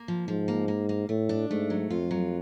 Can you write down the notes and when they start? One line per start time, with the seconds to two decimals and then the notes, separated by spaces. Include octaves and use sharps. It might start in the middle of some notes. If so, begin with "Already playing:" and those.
Already playing: A#3
0.08 F3
0.28 G#2 F3
0.48 A#3
0.68 A#3
0.89 A#3
1.09 A2 A3
1.29 D4
1.50 G#2 A3
1.70 F#3
1.90 F2 F4
2.11 F#3